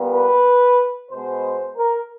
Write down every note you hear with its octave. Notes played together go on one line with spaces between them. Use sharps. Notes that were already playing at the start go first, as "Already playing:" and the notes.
Already playing: A#2 G3 B3
B4
B2 G#3 B3 C5
A#4